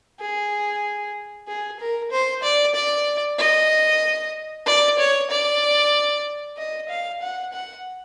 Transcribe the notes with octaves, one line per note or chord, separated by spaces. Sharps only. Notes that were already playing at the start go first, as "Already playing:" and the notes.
G#4
G#4
A#4
C5
D5
D5
D#5
D5
C#5
D5
D#5
F5
F#5
F#5